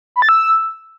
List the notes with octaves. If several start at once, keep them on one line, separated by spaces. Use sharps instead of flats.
B5
A6
E6